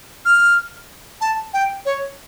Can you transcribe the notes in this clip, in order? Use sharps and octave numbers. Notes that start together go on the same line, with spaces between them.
F6
A5
G5
C#5